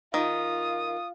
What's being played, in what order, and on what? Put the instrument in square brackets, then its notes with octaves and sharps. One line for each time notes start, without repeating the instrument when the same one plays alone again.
[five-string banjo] D#3 [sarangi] F4 [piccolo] D#6